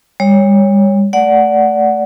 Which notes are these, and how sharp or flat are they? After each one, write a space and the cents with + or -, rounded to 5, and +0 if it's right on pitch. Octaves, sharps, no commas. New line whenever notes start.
G3 +40 C#5 +0
A3 +0 D5 -15 F#5 +0